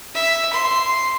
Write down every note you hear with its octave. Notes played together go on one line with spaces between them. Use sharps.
E5
C6